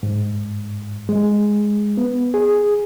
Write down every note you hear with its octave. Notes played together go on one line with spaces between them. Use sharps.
G#2
G#3
B3
G#4